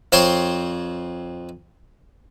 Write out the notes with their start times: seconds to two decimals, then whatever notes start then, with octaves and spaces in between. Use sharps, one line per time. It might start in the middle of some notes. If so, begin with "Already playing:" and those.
0.12 F2 C4 C5 C#5 C6